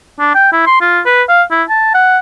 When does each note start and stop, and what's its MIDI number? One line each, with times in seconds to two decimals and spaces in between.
0.20 0.30 62
0.35 0.50 79
0.52 0.64 64
0.67 0.80 84
0.81 1.01 65
1.06 1.23 71
1.29 1.43 77
1.51 1.63 64
1.70 1.90 81
1.94 2.19 78